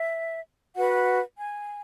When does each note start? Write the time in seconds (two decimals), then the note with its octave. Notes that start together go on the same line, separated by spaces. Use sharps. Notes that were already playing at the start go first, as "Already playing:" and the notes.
Already playing: E5
0.77 F#4 B4 F#5
1.38 G#5